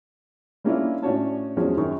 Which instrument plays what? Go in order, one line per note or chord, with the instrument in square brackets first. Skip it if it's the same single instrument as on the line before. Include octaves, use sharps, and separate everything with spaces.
[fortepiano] G3 A#3 C#4 D4 E4 F4
A2 C#4 D4 F#4 C#5 A5
E2 F3 F#3 G#3 C#4
F#2 D#3 C#4 G#4 A#4 C#6